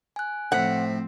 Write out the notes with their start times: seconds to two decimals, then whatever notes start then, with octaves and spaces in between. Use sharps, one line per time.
0.16 G#5 F#6
0.52 A2 F3 C4 C5 F#5 B6